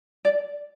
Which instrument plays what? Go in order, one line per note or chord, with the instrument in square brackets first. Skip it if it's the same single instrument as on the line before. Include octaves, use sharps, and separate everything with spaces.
[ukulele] D5